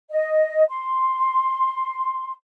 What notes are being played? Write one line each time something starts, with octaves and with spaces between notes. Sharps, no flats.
D#5
C6